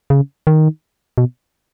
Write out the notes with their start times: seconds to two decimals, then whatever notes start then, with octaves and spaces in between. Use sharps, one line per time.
0.10 C#3
0.47 D#3
1.18 B2